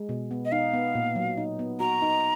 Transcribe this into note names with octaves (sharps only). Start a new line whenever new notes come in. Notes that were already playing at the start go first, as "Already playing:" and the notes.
Already playing: G#3
B2
B3
D#5
D#4 F5
B3
A#2
F#3
D#4
B3
F#4 A#5
D#4